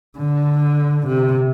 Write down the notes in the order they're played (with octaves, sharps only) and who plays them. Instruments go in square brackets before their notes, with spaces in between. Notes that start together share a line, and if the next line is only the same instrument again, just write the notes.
[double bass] D3
C3